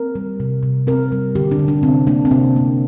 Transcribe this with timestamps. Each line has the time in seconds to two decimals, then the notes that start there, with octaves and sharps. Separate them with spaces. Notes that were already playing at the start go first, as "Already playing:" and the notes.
Already playing: C4 A#4
0.15 G3
0.40 C3
0.63 C3
0.87 C4 A#4
1.12 G3
1.35 D3 G4
1.51 D4
1.59 D3
1.68 D4
1.83 C3 C4
2.07 A#3 D4
2.25 C4
2.31 C3 D4
2.56 A#3